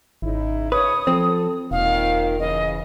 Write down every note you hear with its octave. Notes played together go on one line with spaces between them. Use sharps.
G#1 C#3 D#4 E4
C#3 B4 C#5 D#6
F3 C4 A4
E1 A#2 D#3 F5
C#3 E3 D#5